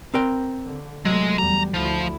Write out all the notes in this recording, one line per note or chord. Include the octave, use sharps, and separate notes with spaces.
C4 A#4 G5
D3
C3 F#3 G#3 A3
E2 G3 A#5
D2 F3 E4